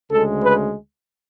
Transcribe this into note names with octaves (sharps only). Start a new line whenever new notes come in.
D2 C#3 G#3 A4
B4